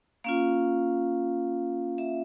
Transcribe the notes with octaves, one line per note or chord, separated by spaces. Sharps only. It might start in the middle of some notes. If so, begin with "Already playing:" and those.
A#3 C#4 F4 F5
E5